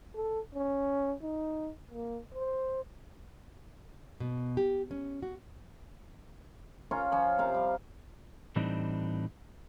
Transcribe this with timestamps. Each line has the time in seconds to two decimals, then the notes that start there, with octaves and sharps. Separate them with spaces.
0.15 A4
0.55 C#4
1.22 D#4
1.91 A#3
2.34 C5
4.20 B2
4.57 G4
4.91 C#4
5.23 F#4
6.91 C#4 F4 C#5 A#5
7.12 F3 C#4
7.38 C3 F5 A#5
7.54 G3
8.56 A2 E3 G3 C4 D4 D#4